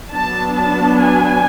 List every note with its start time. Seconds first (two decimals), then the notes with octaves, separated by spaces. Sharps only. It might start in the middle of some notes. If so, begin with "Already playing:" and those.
0.11 F#3 B3 D4 A5
0.57 A5
1.01 G#5